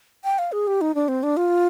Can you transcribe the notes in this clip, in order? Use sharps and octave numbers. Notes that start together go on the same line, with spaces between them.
G5
F5
G#4
G4
D#4
D4
C4
D4
F4